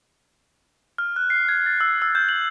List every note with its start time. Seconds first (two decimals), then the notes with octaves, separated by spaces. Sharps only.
0.98 F6
1.16 F#6
1.30 C7
1.49 G#6
1.66 A6
1.81 E6
2.02 E6
2.15 G6
2.29 F#7